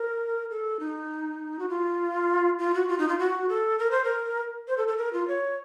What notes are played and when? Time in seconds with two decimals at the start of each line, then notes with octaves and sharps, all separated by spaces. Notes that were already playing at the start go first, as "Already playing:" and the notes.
Already playing: A#4
0.50 A4
0.80 D#4
1.59 F#4
1.69 F4
2.59 F4
2.74 F#4
2.89 F4
2.99 D#4
3.09 F4
3.19 F#4
3.49 A4
3.79 A#4
3.91 C5
4.04 A#4
4.68 C5
4.78 A4
4.88 A4
4.98 A#4
5.13 F4
5.28 C#5